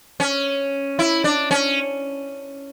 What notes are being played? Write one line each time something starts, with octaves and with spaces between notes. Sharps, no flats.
C#4
E4
D4
C#4